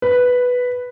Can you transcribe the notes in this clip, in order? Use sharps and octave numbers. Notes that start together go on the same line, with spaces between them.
B4